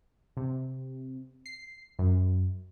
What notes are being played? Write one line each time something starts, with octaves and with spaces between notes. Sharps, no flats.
C3
C7
F#2